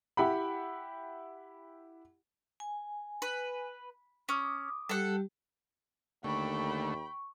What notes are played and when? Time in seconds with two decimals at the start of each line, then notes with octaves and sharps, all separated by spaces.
0.17 E4 G4 F#5 G5 B5
2.60 G#5
3.22 B4
4.29 C#4 D6 D#6
4.89 G3 G4 A4 F#5
6.24 D#2 D3 A3 G5 B5 C#6